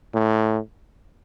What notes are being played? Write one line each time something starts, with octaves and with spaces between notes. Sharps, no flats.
A2